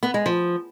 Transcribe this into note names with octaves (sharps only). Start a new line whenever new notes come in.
B3
G#3
F3